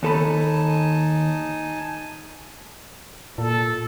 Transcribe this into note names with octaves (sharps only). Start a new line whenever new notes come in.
D#2 D#4 A4 G#5 A5 B5
A#2 A4